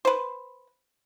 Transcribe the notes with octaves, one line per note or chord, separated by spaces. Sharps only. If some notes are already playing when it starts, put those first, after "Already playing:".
B4 C5